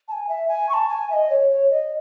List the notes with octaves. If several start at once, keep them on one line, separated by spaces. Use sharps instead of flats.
A5
G#5
E5
G#5
C#6
A5
G#5
E5
D#5
C#5
C#5
D#5